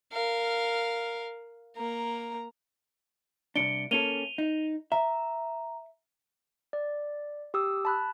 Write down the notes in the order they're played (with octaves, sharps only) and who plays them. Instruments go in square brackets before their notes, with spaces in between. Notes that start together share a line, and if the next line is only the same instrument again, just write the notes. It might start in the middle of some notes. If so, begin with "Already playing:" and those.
[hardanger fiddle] A#4 F5
A#3 A#5
[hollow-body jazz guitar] C2 F2 D4 [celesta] C#7 D7 G7
[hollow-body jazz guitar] A#3 C#4 A4 [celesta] D#7 F7 G7
[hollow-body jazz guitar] D#4
[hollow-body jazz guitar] E5 [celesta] A#5
[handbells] D5
G4 D#6 E6
A5 B5 F#6